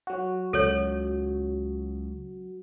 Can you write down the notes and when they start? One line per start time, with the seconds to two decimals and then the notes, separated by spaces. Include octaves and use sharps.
0.07 F#3 F#4
0.53 C#2 A4 C#5